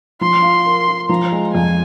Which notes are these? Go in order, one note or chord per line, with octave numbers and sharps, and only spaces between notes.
F3 C6
F4
A#4
F4
F3 A#5
G#3
F2 G#5